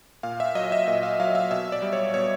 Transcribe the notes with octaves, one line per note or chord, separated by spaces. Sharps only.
A#2 F5
E5
F#3 D#5
E5
A#2 E5
F5
F#3 F5
E5
B2 E5
D5
G3
C#5
B2 C#5